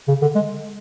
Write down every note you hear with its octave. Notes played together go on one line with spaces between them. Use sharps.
C#3
D3
G#3